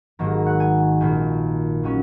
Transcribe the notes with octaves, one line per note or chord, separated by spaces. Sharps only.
G#1 G#2 D#3 F#3 A#3 A#5
F#5
G#5
A#1 A#2 A#3
D#3 F#3 C#4